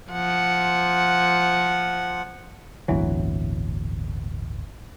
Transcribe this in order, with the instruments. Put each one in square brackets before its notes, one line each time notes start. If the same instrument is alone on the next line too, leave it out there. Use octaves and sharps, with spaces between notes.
[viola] F3 F#5
[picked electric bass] D1 G1 E3 F#3